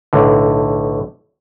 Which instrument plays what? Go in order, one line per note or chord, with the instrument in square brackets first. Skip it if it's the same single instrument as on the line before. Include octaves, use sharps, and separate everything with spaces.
[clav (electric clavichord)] B1 A2 D3